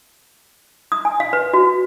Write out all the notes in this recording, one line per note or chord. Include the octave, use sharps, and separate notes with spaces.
D#6
G#5
F5
B4
F#4